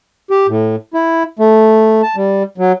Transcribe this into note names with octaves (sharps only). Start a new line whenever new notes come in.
G4
A2
E4
A3
A5
G3
F#3